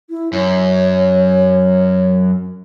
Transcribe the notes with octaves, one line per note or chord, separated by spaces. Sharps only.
E4
F#2 C#5